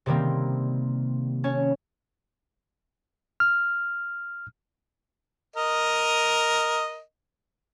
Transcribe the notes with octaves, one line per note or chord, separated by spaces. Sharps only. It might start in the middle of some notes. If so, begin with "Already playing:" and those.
C3 D#3 G3 A#3 C4
C#4 C#5 A5
F6
A#4 D#5